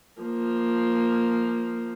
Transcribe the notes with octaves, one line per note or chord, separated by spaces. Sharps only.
F3 A#3